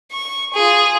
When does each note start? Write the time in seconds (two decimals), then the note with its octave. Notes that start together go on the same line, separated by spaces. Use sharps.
0.12 C#6
0.53 F4 G#4